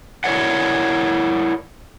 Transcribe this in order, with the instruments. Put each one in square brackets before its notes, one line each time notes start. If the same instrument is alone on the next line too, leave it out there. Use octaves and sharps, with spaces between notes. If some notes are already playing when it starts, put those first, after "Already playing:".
[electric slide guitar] E4 A#4 C#5 D5 F#5